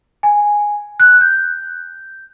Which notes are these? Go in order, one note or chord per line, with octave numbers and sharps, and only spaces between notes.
G#5
F#6
G6